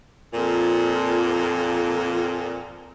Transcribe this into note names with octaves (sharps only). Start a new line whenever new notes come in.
F2 A#2